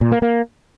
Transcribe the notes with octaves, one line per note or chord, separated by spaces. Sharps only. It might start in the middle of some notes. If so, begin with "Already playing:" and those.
A#2
A#3
A#3